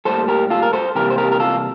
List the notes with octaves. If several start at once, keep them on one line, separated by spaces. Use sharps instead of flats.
A2 G3 A#3 A4 C5
G4 A#4
F4 A4
A#4
A4 C5
C3 E3 G3 A#3 G4 A#4
C5
G4 A#4
A#4
F4 A4